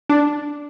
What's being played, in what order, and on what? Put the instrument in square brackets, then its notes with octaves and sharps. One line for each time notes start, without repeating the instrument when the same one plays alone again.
[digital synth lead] D4